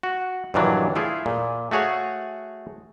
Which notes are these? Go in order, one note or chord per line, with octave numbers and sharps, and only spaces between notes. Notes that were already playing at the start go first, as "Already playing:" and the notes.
F#4
G2 A#2 D#3 E3 F#3 D4
A3 E4 F4 G#4
A#2
A3 F#4 G#4 C#5 F#5